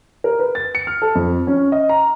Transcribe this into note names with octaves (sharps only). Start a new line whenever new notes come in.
A#4
B4
A6
C#7
F6
A4
F2
C#4
D#5
A#5